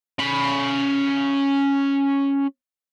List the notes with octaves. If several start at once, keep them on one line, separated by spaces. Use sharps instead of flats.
C#4 B5